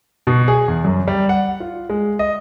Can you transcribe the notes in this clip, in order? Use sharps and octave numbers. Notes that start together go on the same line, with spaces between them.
B2
G#4
E2
F#2
G3
F#5
F4
G#3
D#5